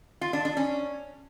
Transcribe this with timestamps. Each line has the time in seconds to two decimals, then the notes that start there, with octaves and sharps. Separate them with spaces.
0.21 F4
0.33 D4
0.45 D4
0.57 C#4